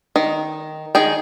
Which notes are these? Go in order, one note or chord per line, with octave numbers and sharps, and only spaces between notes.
D#3
D#3 G#4 G5